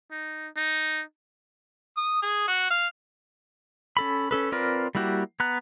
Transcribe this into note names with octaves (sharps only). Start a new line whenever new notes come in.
D#4
D#4
D#6
G#4
F#4
F5
C#4 A4 B5
C#4 A4 B4
C4 F4 A#4 B4 D5
G3 A#3 E4 F#4 G4
B3 A#5 F#6